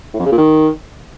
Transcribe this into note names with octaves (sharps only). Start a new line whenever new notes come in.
A2
F2
C#3
A#2
D#3